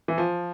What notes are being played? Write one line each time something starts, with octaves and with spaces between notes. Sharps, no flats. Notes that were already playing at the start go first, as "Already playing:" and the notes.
E3
F3